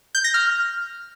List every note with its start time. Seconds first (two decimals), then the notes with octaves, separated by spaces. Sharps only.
0.15 G6
0.24 A#6
0.34 F6